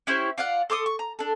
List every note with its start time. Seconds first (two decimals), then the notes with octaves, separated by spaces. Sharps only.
0.07 C#4 E4 G4 C5
0.38 F4 D5 F5 F#5
0.70 A4 C6 D6 D#6
0.86 C#6
0.99 A#5
1.19 D4 A4